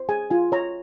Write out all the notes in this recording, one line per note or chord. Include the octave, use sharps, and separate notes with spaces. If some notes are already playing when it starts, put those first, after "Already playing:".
Already playing: C5
G#4 G#5
F4 G#5
C#5 A#5